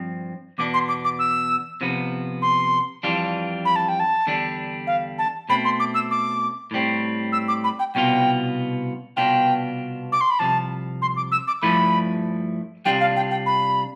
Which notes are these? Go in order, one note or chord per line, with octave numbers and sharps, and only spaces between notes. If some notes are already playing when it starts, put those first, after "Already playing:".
Already playing: G2 F3 C4
E2 B2 B3 D4 D6
C6
D6
D6
E6
C3 F3 B3
C6
F2 E3 G3 D4 F4
B5
A5
G5
A5
E2 D3 G3 D4
F5
A5
B2 A3 C4 B5
C6
D6
E6
D6
A2 G3 C4
E6
D6
B5
G5
C2 B2 B3 F4 G5
C2 B2 B3 D4 F4 G5
D6
C6
B5
C2 C3 F3 A5
C6
D6
E6
D6
G2 F3 A3 E4 B5
C3 G3 D4 F4 G5
F5
G5
G5
B5